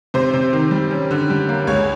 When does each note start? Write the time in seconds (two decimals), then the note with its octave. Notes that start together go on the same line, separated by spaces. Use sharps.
0.14 C3 C5
0.33 C3
0.53 D#3
0.71 G3
0.91 C#4
1.11 D3
1.30 G3
1.49 A#3
1.67 C#2 C#5